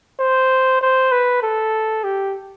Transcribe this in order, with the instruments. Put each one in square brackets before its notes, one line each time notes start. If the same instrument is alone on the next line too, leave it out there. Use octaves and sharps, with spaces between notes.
[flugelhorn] C5
C5
B4
A4
G4